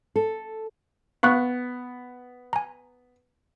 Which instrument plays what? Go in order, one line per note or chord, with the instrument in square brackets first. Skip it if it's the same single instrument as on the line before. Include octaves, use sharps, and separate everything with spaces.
[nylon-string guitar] A4
[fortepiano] B3 [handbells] F5 C#6 F#6
[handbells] G#5 A#5